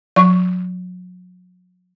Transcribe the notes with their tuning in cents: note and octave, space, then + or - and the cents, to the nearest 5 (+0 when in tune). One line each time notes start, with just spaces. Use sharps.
F#3 -35 C#6 +0